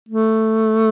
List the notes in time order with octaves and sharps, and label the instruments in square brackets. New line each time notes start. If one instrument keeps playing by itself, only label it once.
[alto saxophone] A3